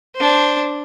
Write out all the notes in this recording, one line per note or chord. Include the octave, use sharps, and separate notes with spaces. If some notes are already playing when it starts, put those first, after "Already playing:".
D4 C5